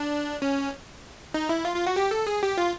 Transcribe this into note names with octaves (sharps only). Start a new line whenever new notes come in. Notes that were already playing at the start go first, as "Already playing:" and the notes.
Already playing: D4
C#4
D#4
E4
F4
F4
F#4
G4
A4
G#4
G4
F4